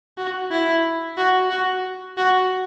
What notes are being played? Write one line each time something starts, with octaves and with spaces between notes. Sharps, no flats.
F#4
E4
F#4
F#4
F#4